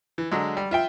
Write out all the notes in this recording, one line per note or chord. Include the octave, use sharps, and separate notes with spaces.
E3
D3 F#3 G#3
G3
F4 E5 G5